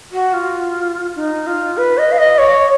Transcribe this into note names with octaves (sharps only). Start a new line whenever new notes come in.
F#4
F4
D#4
F4
B4
D#5
F5
D#5
C#5